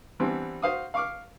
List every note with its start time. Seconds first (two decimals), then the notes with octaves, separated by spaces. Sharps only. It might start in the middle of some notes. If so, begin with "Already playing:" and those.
0.20 E3 G3 B3 C4 D4 E4
0.62 F#4 C5 F5 D#6
0.94 F5 C#6 D6 F6